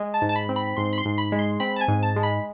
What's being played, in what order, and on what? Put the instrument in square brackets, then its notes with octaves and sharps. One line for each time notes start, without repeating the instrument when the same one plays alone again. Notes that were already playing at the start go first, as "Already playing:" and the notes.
Already playing: [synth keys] G#3
A5
G#2
A5
B5
C4
B5
G#2 C6
B5
C6
G#2
B5
G#3
C6
C4 B5
A5
G#5
G#2
A5
G#3
B5